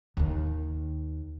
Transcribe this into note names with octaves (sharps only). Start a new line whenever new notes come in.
D#2 D#3